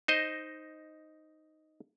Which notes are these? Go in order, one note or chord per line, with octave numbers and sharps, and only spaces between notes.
D#4 C5 D#5